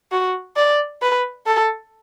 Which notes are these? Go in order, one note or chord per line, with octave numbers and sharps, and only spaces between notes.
F#4
D5
B4
A4